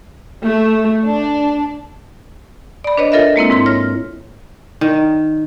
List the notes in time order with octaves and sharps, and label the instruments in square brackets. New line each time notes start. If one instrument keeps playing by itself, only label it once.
[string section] A3
D4
[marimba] D5 B5
D4 B4 C#5 D#5
F4 A4 A#4 C#5 D#5 E5
G#3 A#3 C4 E4
G#2 E4 C6
C#5 F6 A#6
[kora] D#3